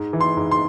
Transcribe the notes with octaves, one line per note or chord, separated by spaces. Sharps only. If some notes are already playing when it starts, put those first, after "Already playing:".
Already playing: G#2
E3
C6
G#2
C6